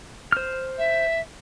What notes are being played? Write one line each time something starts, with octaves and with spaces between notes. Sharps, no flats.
C5 F6
E5